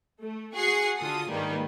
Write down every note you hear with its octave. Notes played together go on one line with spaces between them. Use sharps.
A3
F#4 G#4 F#5 C#6 C7
D3 F4 A4 D#6
G#2 D#3 G3 A#3 B4